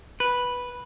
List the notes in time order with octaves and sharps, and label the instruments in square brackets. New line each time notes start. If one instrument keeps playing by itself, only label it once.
[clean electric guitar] B4